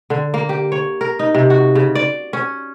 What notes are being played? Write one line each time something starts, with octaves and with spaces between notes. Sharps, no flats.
D3
A#3
G4
C#5
A#4
D#4
C3
F#4
C#3
D5
C#4